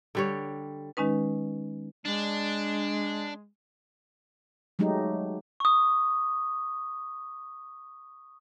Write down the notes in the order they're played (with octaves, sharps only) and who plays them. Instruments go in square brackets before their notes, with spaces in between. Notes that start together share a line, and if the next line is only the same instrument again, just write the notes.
[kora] D3 G3 C#5
[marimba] D#3 G#3 C#4 D#4 B4
[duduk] G#3 [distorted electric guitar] D4
[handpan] F#3 G#3 A3 D#4 G4
[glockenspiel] C#6 D#6